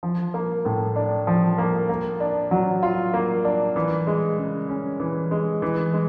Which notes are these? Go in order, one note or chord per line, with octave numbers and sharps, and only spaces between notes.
F3
A#3
A2
D4
F3
A#3
A#3
D4
F#3
F4
A#3
D4
E3
G#3
C#3
C#4
E3
G#3
E3
G#3